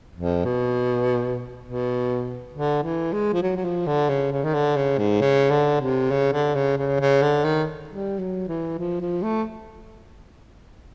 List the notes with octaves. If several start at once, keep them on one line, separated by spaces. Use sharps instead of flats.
F2
B2
B2
D3
E3
G#3
F3
F#3
F#3
F3
D3
C#3
C#3
D#3
D3
C#3
G#2
C#3
D3
C3
C#3
D3
C#3
C#3
C#3
D3
D#3
G3
F#3
E3
F3
F3
A3